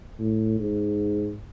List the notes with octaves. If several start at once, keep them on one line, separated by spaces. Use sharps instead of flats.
A2
G#2